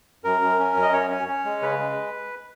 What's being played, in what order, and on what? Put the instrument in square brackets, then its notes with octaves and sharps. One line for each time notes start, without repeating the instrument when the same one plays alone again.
[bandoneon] F#2 A#4
F#2
C#4
F#2
D#5
C#4 C#5
C#4
C#4
G#3
C#3 B4
G#3